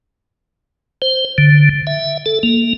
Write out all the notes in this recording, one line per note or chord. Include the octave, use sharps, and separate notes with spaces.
C5
D3
E5
A4
A#3